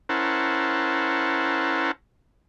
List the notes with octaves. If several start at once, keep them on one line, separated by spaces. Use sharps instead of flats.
C#4 E4 A#4 C5 F#5 A5